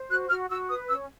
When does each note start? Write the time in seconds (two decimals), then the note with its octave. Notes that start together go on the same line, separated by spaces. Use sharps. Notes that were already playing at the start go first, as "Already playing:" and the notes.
Already playing: C5
0.09 F#4 F#6
0.29 F#4 F6
0.50 F#4 E6
0.69 B4 D#6
0.89 C#4 E6